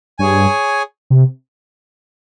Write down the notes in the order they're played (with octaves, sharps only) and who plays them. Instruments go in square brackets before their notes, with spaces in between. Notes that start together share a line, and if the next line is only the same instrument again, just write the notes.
[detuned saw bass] G2 [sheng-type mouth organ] G#4 C#5 G#5
[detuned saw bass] C3